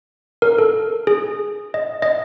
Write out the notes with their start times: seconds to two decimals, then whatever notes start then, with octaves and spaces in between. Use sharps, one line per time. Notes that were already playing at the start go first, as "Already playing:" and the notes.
0.42 A#4
0.58 A4
1.07 G#4
1.74 D#5
2.02 D#5